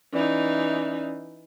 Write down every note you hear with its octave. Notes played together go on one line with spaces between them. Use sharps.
E3 C#4 D#4 D5